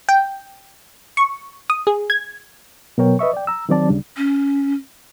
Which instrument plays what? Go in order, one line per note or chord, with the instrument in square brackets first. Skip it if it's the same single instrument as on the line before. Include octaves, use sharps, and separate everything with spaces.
[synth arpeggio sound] G5
C#6
D#6
G#4
G#6
[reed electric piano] B2 F#3 B3 A#4 C#5 G5
B4 D#5 E5 C#6
D5 G5
A#5 E6
D#3 F#3 C4 D5 A5
D2 C#3 G3 D4
[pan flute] C#4